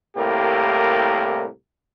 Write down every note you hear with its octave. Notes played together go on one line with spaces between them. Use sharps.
C2 A2 A#3 G4 A#4